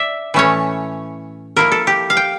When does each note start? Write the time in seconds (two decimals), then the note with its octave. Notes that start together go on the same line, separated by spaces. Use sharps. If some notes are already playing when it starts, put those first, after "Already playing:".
Already playing: D5 E5
0.34 A2 E3 A3 C#4 E4 C#5
1.56 F3 A#3 E4 A#4
1.72 A4
1.87 G4
2.10 F5
2.17 G5